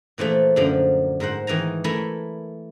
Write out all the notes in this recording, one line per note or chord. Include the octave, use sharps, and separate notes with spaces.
A#2 E3 F3 A3
F#2 D3 F3
G#2 A#4 C5 F#5
D#3 E3 G#5 A#5
A3 E4 A#4 G#5